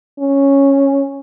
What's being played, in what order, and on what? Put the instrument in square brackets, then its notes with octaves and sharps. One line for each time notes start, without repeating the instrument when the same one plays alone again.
[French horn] C#4